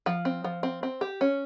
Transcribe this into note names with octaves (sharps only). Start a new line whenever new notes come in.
F3
C4
F3
C4
C4
G4
C#4